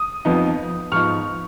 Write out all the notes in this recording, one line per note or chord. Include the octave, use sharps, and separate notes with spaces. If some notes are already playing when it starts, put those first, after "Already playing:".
Already playing: D#6
F2 F3 B3 D#4
G#2 F3 B3 D#4 C#6 F6